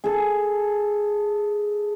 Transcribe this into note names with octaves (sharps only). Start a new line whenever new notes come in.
G#4 A4